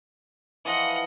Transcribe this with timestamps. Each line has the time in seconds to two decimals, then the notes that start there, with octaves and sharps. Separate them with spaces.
0.65 E3 F3 F4 D#5 F#5